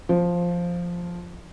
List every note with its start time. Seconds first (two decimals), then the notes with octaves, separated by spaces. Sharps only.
0.09 F3